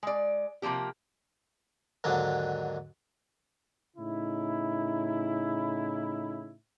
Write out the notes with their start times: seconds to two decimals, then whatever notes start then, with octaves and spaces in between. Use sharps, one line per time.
0.03 G#3 D5
0.62 C3 F3 F#3 A#3 G4
2.04 D#2 G#2 D3 F#3 D4
3.97 A2 C#3 D#4 E4